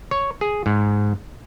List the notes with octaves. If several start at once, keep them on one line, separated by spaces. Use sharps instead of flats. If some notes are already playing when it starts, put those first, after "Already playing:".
C#5
G#4
G#2